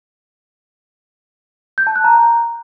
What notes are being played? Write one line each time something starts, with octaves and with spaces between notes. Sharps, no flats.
G6
A5
F#6
A#5